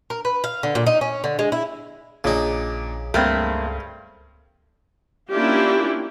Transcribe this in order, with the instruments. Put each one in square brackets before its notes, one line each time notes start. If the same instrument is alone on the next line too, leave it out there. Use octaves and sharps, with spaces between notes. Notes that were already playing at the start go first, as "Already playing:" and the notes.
[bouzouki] A#4
B4
F5
D3
A#2
D#4
C#4
D3
G#3
E4
[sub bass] A#1 [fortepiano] A#2 D4 [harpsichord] C#3 D#4
[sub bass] C#2 [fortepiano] G2 [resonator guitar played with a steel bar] A3 A#3 C4
[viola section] A#3 C#4 D4 E4 F4 G4